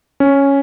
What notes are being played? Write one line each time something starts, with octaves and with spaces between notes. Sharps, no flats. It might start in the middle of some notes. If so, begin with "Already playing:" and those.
C#4